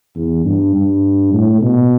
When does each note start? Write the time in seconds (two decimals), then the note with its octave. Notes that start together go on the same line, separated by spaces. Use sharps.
0.15 E2
0.44 G2
0.75 G2
1.33 A2
1.62 B2